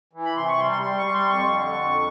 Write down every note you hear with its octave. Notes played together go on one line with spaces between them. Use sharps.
E3
B5
C3 C6
C#6
G3 C6
C6
G3 C6
C#6
G3
C6
F2 C#6
D3
F2